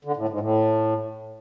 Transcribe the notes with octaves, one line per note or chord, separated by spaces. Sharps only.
D3
A2
G#2
A2